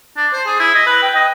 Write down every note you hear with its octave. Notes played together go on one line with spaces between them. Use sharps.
D4
C5
G#4
E4
D#5
B4
G5
D#5